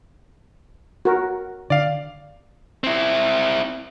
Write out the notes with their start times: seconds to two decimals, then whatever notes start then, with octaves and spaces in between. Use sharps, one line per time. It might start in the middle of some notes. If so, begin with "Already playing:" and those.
1.05 F#4 A#4
1.70 D3 D5 F5
2.84 C4 E4